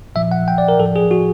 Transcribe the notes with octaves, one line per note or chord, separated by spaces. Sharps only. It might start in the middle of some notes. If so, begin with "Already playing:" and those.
A#2 F3 E5
F#5
G5
D5
A#4
A2 F3 A4
G#4
F#4